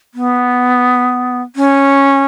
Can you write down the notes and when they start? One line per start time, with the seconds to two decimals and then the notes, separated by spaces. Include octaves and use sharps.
0.14 B3
1.56 C#4